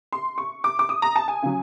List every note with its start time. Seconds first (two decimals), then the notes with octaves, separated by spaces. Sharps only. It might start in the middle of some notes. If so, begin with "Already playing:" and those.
0.12 C6
0.38 C#6
0.64 D6
0.79 D6
0.89 D#6
1.02 A#5
1.16 A5
1.28 G#5
1.42 C#3 F#3